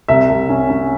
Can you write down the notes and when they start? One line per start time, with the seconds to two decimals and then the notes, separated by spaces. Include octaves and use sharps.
0.08 C2 E5
0.30 C2
0.49 C#4
0.70 C#4